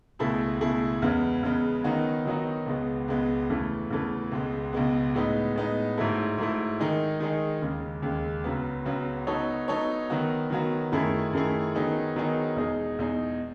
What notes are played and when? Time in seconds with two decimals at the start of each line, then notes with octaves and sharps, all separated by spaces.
0.19 C#2 B2 A3 E4 G#4
0.61 C#2 B2 A3 E4 G#4
1.02 E2 C#3 G#3 B3
1.43 E2 C#3 G#3 B3
1.84 D#3 F#3 B3 D#4 F#4
2.25 D#3 F#3 B3 D#4 F#4
2.66 C#2 B2 G#3 B3
3.08 C#2 B2 G#3 B3
3.49 E2 C#3 E3 A3
3.91 E2 C#3 E3 A3
4.32 C#2 B2 G#3 B3
4.73 C#2 B2 G#3 B3
5.14 A2 G#3 B3 D#4
5.55 A2 G#3 B3 D#4
5.97 G#2 F#3 A3 E4
6.38 G#2 F#3 A3 E4
6.79 D#3 G#3 D#4 G#4
7.20 D#3 G#3 D#4 G#4
7.61 D#2 C#3 G#3
8.03 D#2 C#3 G#3
8.44 C#2 C#3 F#3 B3
8.85 C#2 C#3 F#3 B3
9.27 F#3 B3 D#4 A4 C#5
9.68 F#3 B3 D#4 A4 C#5
10.10 D#3 F#3 B3 F#4
10.50 D#3 F#3 B3 F#4
10.92 F#2 D#3 A3 E4 G#4
11.33 F#2 D#3 A3 E4 G#4
11.75 D#3 F#3 B3 D#4 G#4
12.16 D#3 F#3 B3 D#4 G#4
12.56 E2 B2 G#3 D#4 G#4
12.99 E2 B2 G#3 D#4 G#4